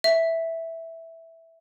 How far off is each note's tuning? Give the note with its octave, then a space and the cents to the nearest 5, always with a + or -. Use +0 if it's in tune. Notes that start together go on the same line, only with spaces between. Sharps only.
E5 -5